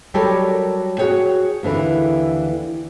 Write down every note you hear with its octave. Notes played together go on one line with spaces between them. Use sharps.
F#3 G3 G4 A4 A#4 C#5
F#4 G#4 C#5 G5
D#2 D3 E3